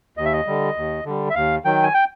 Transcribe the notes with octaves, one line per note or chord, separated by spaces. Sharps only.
D#2 D#5
E5
D#5
D3 G3
D#2
D3 G3
E5
D#2 F5
D#3 F#3 G5
G#5
G5